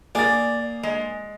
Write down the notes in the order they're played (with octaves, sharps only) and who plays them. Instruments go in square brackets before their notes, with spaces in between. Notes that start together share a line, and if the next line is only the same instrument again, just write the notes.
[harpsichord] A#3 [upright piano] G#4 A6 [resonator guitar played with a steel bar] D5
[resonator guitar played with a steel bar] G#3